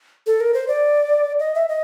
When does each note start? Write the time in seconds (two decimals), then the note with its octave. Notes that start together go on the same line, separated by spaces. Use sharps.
0.27 A4
0.41 A#4
0.54 C5
0.68 D5
1.40 D#5
1.55 E5
1.69 D#5